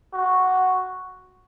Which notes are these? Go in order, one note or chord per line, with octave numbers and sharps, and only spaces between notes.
F#4